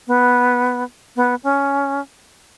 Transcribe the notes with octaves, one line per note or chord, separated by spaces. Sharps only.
B3
B3
C#4